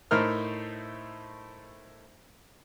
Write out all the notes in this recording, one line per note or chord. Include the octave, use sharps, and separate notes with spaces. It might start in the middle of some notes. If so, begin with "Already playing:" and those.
A2 A3 D#4 A#4 C5 F6